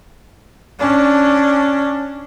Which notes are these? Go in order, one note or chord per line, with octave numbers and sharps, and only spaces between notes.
C#4 D4